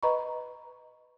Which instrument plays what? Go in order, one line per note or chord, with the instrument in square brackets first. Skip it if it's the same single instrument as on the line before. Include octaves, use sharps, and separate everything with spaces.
[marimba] B4 D#5 A#5 B5 C#6